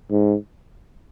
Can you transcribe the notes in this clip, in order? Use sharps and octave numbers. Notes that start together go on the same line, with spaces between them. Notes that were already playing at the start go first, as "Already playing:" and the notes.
G#2